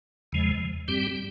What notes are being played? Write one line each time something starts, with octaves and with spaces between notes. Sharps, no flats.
E2 C#3 F3 G#3
G2 G3 C4 G4